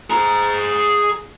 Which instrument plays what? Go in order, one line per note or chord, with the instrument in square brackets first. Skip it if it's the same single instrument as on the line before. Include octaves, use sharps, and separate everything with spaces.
[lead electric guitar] G#4 A#5